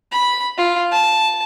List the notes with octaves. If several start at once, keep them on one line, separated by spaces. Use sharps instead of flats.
B5
F4
A5